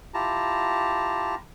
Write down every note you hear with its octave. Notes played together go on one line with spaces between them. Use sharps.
E4 F4 G4 A5 A#5